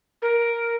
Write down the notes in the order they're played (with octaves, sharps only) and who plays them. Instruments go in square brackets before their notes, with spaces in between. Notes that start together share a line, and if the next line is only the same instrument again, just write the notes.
[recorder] A#4